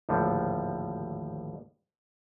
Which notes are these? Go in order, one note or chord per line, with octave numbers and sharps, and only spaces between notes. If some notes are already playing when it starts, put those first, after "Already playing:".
G#1 D#2 A2 D3 F3 G3